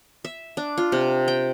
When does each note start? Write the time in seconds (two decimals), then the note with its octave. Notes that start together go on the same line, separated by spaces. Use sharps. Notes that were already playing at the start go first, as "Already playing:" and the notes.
0.25 E5
0.57 D4
0.78 F4
0.92 C3
1.28 G5